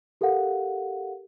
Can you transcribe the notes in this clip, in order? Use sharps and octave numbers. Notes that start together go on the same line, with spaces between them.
G4 A4 A#4 F5 F#5